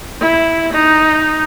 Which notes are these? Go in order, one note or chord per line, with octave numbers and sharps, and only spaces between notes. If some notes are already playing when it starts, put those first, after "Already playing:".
E4
D#4